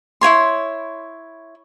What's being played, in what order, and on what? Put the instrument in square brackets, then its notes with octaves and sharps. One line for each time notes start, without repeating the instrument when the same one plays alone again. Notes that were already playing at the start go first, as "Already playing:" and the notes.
[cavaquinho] E4 F4 C#5 C6